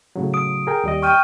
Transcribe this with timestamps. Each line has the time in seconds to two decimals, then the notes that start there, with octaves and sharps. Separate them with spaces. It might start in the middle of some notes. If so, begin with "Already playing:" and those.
0.16 A2 C#3 F#3
0.34 D#6 D7
0.67 G#4 A#4 G5
0.84 D#2 G3 D#5
1.03 G5 C#6 F6 D#7